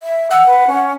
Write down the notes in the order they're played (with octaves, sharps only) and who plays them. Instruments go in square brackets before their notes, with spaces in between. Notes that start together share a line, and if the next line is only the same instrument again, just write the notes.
[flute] E5
[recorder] F#5 [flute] E6
[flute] B4
C#4